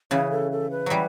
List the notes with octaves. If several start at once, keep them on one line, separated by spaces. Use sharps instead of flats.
C#3 E3 C#5
A4
A4
B4
E3 F#3 G3